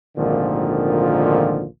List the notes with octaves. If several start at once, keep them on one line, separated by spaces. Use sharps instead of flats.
G#1 D2 A#2 D3 D#3 F3